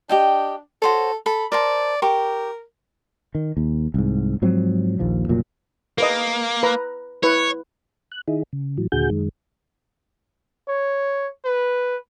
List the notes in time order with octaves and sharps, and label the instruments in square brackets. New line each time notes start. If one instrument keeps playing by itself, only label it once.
[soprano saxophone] D4 [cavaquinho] G4 D#5 G5
[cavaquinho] F#4 C5 C#5 [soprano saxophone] A4
[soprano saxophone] A4 [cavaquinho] B5
[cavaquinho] A#4 C5 A5 [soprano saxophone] D5
[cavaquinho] G4 C#6 D6 [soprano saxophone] A#4
[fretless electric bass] D#3
D#2
C2 G#2
G#2 F3 F#3 C4
A#1 D#2 F3
F1 A#2 F#3
[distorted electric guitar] A#3 [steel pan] A#4 B4 D#5
[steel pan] B4 A#5
[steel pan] E4 B4 [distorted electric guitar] C#5
[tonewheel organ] F#6
D#3 D#4 E4 G#4
C#3
A2 E3 F#3
D#2 A#2 D3 F#4 G#4 G6
F#2 D#3 G#3
[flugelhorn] C#5
B4